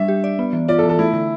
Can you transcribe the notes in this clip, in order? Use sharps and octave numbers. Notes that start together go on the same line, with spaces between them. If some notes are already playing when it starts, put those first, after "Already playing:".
Already playing: G3 D4 E5
G4
D5
B3
E3
F4 D5
A4
E3
A4
A3 E4
D3